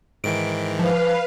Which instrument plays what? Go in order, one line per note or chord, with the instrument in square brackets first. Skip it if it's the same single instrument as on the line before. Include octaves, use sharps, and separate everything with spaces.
[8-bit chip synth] G#2 D#3 E3 [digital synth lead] D7
[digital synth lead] F3 [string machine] B4 F5